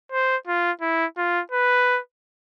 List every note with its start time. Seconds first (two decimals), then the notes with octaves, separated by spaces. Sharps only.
0.12 C5
0.47 F4
0.82 E4
1.17 F4
1.52 B4